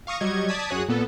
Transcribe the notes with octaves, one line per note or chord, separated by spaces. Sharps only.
F5 C#6 D#6 A#6
F#3 G3 D#5 C#6 G#6
D5 A5 D#6 G#6 B6
F#2 F#4 G#4 C#5 D#6 F#6
A#2 B3 A4